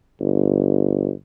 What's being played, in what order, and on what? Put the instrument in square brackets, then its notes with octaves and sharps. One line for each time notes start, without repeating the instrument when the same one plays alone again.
[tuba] G1